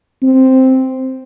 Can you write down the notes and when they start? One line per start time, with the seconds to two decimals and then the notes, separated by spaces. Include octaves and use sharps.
0.23 C4